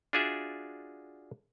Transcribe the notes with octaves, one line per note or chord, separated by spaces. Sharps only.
D4 F4 F#4 G#4 D5 E5